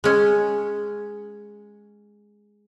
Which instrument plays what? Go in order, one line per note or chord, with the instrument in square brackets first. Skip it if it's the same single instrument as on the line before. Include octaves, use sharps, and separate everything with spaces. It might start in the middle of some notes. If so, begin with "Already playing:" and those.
[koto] G#3 C#4